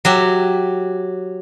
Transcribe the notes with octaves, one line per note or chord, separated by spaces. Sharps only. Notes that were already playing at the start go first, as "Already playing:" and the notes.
F#3 G4 E5